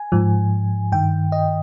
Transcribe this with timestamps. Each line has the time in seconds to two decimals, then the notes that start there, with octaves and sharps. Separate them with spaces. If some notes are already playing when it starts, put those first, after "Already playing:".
Already playing: G#5
0.12 G#2 F3
0.92 G2 D#3 G5
1.32 D#5